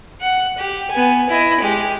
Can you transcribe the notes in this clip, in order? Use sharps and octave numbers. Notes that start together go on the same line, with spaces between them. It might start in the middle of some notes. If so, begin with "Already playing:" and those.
F#5
G4
B3 G#5
E4 D#5
G#3 G4